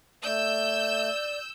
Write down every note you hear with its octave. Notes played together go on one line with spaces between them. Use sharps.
A3 D5 E6 G6